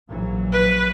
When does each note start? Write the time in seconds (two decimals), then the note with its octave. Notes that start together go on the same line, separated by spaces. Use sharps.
0.10 A#1 E3 F#3
0.52 B4